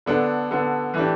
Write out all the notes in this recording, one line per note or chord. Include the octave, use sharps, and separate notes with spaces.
D3 B3 D4 A4
D3 B3 D4 A4
E3 A3 D4 G4